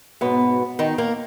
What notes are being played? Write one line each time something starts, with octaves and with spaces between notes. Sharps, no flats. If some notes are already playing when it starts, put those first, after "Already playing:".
G#2 B2 F#3 B3
D#3 D#4
A#3 A#4